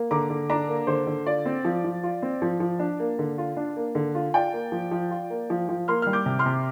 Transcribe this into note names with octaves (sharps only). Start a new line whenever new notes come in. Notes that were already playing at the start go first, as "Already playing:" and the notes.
Already playing: A#3
D3 A#5 D6
D3
D4 A#5 D6
A#3
D3 C5
D3
F4 D5
C4
F3
F3
F4
C4
F3
F3
D4
A#3
D3
F4
D4
A#3
D3
F4
F4 D5 G5
A#3
F3
F3
F4
A#3
F3
F3
A#3 C6 F6
G3 F6
D6 G6
C3
C6 F6
C3